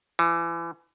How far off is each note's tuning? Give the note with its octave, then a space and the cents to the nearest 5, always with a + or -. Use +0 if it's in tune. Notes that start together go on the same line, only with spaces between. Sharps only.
E3 +30